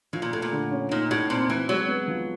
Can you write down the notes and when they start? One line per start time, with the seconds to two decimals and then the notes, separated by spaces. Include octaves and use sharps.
0.13 A2 F3
0.22 A#2
0.33 A2 A3
0.42 A#2
0.51 D3
0.71 C#4
0.91 A#2 D#4
1.11 A2 F#4
1.30 A#2 C4
1.49 E3 C4
1.69 F#3 G#3
1.88 B3
2.08 F3